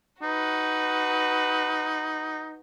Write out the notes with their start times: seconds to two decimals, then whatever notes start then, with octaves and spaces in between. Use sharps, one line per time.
0.22 D#4 F#4 B4